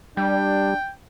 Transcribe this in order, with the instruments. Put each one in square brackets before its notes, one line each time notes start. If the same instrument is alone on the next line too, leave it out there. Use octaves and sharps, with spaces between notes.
[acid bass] G3 [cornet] D4 [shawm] G5